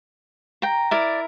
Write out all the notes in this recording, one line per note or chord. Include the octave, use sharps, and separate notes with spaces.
G5 A#5
E4 A#4 D5